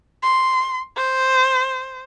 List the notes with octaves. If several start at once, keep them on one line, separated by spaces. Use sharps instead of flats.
C6
C5